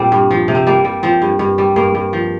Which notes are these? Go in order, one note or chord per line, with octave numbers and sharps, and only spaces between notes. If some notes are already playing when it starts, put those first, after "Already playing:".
Already playing: A#2 G3 C4 D4
G2
F3
C3
C4
G3 A#3
G3
F3 C4
G2
G2
G3
G2 A#3
G2
F3